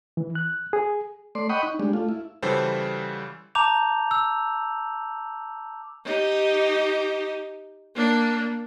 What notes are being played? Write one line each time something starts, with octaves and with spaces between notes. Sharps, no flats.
E3
F#6
G#4
A3 D5 C6
D#5 F#5 G5 B5 C#6 D#6
D#4
G3 G#3 D4
A3 F4
E4
C#3 E3 G3 F#4 A4 C5
A5 A#5 D6 G6 F7
E6
D#4 G4
A#3 D4